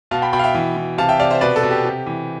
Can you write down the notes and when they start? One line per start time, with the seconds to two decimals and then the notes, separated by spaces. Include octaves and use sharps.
0.11 B2 F5 A5
0.22 G5 B5
0.33 B2 G5 B5
0.39 F5
0.44 E5 G5
0.55 E3
0.77 E3
0.98 C3 F5 A5
1.09 E5 G5
1.20 C3 D5 F5
1.30 C5 E5
1.41 B2 B4 D5
1.56 A4
1.63 B2
1.71 G4
1.85 C3
2.07 E3